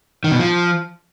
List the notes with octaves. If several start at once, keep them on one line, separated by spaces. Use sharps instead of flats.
D#3
B2
F3